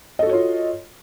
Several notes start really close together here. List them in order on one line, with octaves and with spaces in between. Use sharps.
D#5 A4 F#4 C#5 F4